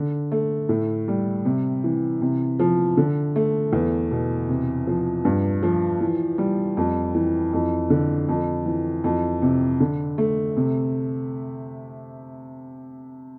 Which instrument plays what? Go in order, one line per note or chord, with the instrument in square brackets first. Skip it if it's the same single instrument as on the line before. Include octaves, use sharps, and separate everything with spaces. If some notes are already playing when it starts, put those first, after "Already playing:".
Already playing: [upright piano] D3
A3
A2
G3
C3
E3
C3
F3
D3
A3
E2
B2
C3
F3
G2
F3
E3
G3
F2
E3
F2
D3
F2
E3
F2
C3
D3
A3
C3